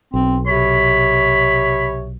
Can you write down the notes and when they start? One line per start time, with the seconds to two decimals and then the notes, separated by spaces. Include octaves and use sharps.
0.14 B1 C4
0.47 C3 C#5 B5